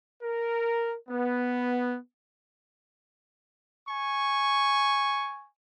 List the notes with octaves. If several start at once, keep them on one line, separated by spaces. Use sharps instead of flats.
A#4
B3
G#5 C#6